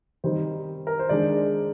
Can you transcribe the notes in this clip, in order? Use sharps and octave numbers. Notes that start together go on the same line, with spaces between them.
D#3 G3 C4 D#4 C5
A#4
C5
D#3 G#3 D4 D5